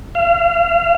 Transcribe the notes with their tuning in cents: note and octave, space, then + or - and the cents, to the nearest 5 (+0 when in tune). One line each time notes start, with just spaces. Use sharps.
F5 -35